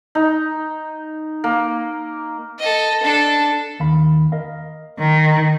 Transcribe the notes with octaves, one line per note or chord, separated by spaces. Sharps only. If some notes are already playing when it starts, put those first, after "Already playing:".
D#4
A#3
A4 D#5
D4 A4
D#2 F5 B5
A#4 D#5 F5
D#3